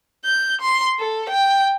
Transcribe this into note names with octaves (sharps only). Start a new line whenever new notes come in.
G6
C6
A4
G5